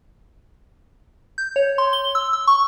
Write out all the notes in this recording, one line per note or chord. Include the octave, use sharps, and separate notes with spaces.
G6
C#5
C6
G7
E6
E6
C#6